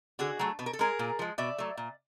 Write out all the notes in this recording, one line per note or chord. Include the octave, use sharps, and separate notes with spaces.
D3 F#4 G#4
F#3 A3
B2 B4
A#4
A4
G#3 G#4 A#4
A#2
F3 G#3
B2 D5 E5
F#3 A3
A#2